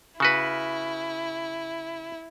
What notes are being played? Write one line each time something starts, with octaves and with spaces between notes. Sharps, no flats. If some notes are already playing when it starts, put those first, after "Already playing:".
C#3 E4 F#4 B4